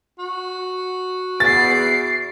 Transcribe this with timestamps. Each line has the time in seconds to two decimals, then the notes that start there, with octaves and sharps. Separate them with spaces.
0.19 F#4
1.40 E2 B3 A6 C7 D7